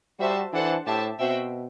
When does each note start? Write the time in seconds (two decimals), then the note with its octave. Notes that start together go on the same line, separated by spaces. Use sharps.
0.20 G3 F#4 C5 E5 A5
0.53 E3 D4 A4 C5 F#5 A5
0.86 A2 G4 C5 E5 A5
1.19 B2 C4 F#4 C5 E5 G5